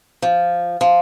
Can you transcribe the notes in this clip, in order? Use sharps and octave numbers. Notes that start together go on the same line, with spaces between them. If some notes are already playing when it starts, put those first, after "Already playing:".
F3
F3